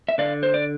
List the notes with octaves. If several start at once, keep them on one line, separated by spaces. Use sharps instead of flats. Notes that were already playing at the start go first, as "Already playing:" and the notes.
E5
D3 D5 F5
C5
D5